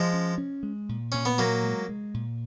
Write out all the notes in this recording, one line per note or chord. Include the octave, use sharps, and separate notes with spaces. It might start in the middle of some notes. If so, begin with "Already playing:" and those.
Already playing: F3 G#3
C#4
C#4
G#3
A#2
A#2 C#4
B3
A#2 F#3 A#3
G#3
G#3
A#2